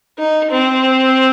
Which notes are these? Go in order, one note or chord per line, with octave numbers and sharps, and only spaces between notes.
D#4
C4